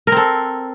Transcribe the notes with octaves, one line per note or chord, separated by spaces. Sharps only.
C4 A4 A#4